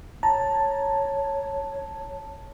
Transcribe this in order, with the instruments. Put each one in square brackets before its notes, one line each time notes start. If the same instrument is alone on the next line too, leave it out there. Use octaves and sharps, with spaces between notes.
[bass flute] C#5 [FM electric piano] A5 [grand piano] A#5